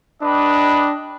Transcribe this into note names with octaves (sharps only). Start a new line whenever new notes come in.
D4 G4 B4 D#5